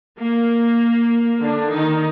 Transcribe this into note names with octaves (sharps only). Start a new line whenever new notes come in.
A#3
D3 D4
D#3 D#4